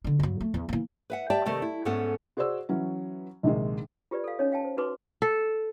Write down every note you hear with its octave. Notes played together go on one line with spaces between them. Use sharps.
D3 D4
G2 F#3
A3
E2
E3 A#3
B4 E5 F#5
G4 D5 E5 G5 A5
C3 D#3 A3 D#5
E4
G#2 A3 B3 C#4 A4 F#5
F#4 G#4 C5 D5 E6
E3 F#3 C#4
A#1 C3 D#3 G#3
F4 G4 B4 D5
A4 F5
C#4 D#4 C#5 D#5
F5 G5 A5
C5
D#4 F#4 B4 C6 D6
A4